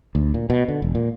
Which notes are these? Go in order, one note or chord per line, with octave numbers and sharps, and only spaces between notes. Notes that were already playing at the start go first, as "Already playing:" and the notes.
D2
A#2
B2
D3
E1
A#2